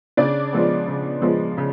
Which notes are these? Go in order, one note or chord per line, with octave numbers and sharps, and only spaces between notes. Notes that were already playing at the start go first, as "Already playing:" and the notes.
C#3 D4 D5
F3 G#3 B3
C#3
F3 G#3 B3
C#3